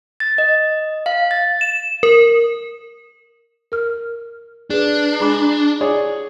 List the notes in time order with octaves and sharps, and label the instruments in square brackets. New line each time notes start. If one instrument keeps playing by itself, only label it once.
[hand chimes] A6
D#5
F5
A6
[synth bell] E7
A#4
[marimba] A#4 F6
[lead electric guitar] D4 [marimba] G#4 B4
[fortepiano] G#3 [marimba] A#5 B5 D6
[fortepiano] G#4 C#5 D5